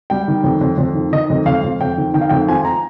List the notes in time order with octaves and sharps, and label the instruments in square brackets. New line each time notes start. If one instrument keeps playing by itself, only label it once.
[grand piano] G3 G5
D#3
F2
F2
F2
D#3
D#3 D#5
F2
F2 F5
F2
F2 G5
D#3
D#3 G5
F5
F2 G5
F3 G#5
A#5